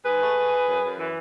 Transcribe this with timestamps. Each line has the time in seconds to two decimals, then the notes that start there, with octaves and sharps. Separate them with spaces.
0.06 G#2 G#4 B4
0.22 A3
0.37 A3
0.52 E3
0.68 F#2
0.84 F#2
0.99 E3